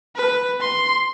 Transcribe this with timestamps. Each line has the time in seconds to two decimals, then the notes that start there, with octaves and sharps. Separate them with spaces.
0.16 B4
0.60 C6